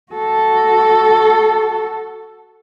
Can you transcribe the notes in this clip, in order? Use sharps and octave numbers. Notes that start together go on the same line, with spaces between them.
F#4 A4